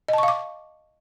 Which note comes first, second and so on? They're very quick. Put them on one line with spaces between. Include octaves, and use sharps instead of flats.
D#5 A5 C#6 F5 D6